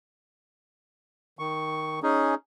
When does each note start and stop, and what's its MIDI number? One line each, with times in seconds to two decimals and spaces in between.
1.39 2.00 51
1.39 2.00 85
2.03 2.35 61
2.03 2.35 63
2.03 2.35 68